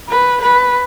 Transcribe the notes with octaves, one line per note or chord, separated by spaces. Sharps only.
B4
B4